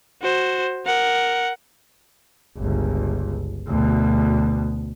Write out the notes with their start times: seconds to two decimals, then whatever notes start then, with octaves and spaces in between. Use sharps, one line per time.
0.22 F#4 C5
0.86 A#4 F#5
2.57 G1 C#2
3.67 D2 B2